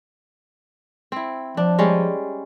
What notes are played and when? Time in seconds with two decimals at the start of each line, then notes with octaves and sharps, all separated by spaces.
1.12 C4 E4
1.57 F3 D4
1.79 G3 G#3 C#4